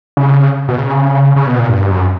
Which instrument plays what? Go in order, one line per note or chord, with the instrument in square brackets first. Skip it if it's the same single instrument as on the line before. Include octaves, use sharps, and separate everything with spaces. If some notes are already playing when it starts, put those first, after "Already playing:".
[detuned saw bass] C#3
B2
C#3
C#3
B2
A#2
G2
F#2